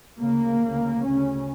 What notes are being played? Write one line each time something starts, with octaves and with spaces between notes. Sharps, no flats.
D2 C#3 A#3
D2 C#3
D2 C#3 C#4